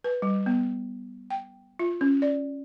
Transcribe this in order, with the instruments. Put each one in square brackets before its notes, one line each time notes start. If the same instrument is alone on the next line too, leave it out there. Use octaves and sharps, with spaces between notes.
[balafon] B4
G3
B3
G5
F4
C#4
D5